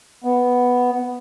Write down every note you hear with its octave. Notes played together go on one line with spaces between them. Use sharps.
B3